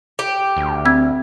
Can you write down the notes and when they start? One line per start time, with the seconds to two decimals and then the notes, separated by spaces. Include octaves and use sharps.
0.19 G4
0.57 D2
0.85 C4 E6 G#6